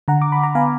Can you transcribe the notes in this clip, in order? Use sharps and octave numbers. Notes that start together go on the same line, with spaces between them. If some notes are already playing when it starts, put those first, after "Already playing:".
D3 F#5 A#5
D6
B5
A#5
B3 F5 G#5